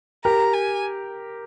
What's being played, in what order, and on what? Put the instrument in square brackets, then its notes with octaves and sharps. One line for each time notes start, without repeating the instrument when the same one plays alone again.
[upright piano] G4 A#4 [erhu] A#5
[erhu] G#5